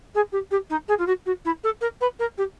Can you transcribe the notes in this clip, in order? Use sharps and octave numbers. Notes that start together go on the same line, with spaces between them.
G#4
G4
G4
D#4
G#4
F4
F#4
F#4
E4
A4
A#4
B4
A#4
G4